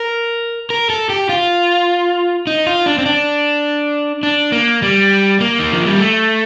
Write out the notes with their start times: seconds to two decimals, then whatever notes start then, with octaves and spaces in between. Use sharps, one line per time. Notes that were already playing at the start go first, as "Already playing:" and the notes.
Already playing: A#4
0.70 A#4
0.90 A4
1.10 G4
1.29 F4
2.47 D#4
2.67 F4
2.86 D4
2.98 C4
3.06 D4
4.23 D4
4.52 A#3
4.82 G3
5.41 A#3
5.59 D#3
5.73 F3
5.86 G3
5.99 A3